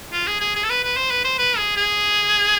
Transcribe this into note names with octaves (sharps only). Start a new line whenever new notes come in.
F4
G#4
G#4
G#4
A4
B4
B4
C5
B4
C5
B4
G#4
G#4